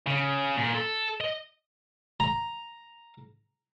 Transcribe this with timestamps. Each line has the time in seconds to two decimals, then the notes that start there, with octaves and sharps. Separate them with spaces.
0.07 C#3
0.57 A#2
0.74 A4
1.21 D#5
2.20 A#5